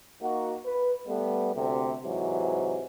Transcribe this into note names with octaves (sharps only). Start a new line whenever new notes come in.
A#3 D#4 F#4
B4
G3 A3 B3
D2 C3
G#2 C3 E3 F#3